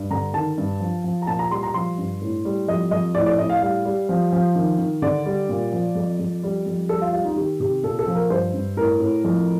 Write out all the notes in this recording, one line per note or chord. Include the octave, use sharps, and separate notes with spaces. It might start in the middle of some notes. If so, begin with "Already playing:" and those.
Already playing: G2
D3 A#5
D#3 A5
G2
F3
F3
A#5
A#2 A5
A#5
G3 C6
A#5
F3 C6
G2
A2
G3
F2 D#5
F2 D#5
A2 D5
D5
A2 D#5
F5
G3 F5
G3
F3
F3
D#3
D#3
D3 D5
G3
A#2
F3
F2
F2
G3
F2
G3 A4
F4
G3 F4
D#4
D#3 G4
C3 G4
A#2 A4
A4
F3
A#4
G2 C5
G2
A2 A#4
A2
F2